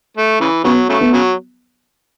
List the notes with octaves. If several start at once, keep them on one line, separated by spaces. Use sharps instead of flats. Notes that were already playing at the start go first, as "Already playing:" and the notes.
A3
C#3 E3
C#3 F#3 B3
C#3 F#3 A3
B3
C#3 F#3